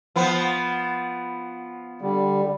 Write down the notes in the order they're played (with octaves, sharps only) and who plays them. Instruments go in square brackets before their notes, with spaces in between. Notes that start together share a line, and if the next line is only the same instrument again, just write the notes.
[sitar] F3 B3 B4
[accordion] D3 G3